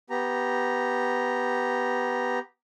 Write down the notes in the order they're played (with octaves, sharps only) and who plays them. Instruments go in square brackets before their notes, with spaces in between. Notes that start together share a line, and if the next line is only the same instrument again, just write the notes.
[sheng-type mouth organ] B3 G4 A#5